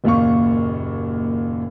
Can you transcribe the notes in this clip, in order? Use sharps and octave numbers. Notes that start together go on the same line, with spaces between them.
F#1 D#2 A#2 F5 C#6